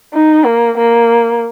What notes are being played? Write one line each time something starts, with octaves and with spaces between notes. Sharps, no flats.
D#4
A#3
A#3